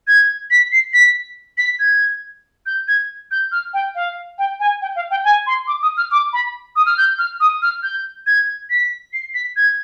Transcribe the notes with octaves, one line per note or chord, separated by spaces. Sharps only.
G#6
B6
C7
B6
B6
G#6
G6
G#6
G6
F6
G5
F5
G5
G#5
G5
F5
G5
G#5
C6
D6
D#6
F6
D6
B5
D#6
F6
G6
F6
D#6
F6
G6
G#6
B6
C7
B6
G#6